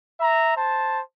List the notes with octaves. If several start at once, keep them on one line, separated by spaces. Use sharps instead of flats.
E5 A#5
C5 A5